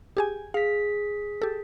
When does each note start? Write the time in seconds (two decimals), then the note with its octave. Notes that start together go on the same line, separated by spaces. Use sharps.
0.17 G4 G#4 G#5
0.54 G#4 F5 B6
1.42 G4 A4